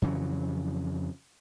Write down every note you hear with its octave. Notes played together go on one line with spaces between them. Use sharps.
F2 C#3 E3 F#3